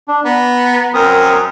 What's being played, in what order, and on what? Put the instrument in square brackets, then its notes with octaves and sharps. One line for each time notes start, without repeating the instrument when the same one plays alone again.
[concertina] D4
[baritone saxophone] B3 [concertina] A#5
[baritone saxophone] F#2 [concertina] C4 A#4 D#6